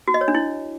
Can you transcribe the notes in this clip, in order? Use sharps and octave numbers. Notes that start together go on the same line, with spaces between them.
F#4
D#5
C#5
D4
E4